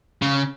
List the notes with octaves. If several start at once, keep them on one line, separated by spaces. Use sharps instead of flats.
C#3